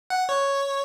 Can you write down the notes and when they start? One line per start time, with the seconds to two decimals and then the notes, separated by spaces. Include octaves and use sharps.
0.10 F#5
0.29 C#5